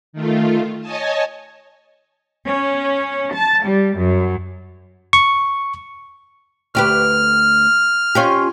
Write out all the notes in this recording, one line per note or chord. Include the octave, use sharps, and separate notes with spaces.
D#3 A3 F4
C#5 D#5 G#5 A5
C#4
A5
G3
F#2
C#6
D2 G4 B4 F6
C#4 F4 G4